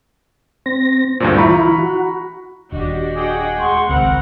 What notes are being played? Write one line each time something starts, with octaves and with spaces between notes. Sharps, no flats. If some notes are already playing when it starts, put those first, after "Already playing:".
C4 A#6
D2 G2 A#2 C5
E3 E4 F4 A#5 B5 C#6
F#4
D#1 D4 F#4 G4 D#5
F#4 G#4 F#5 G5
G#3 F#5 C6 C#6
G#1 C#2 C4 A#4 F#5 B5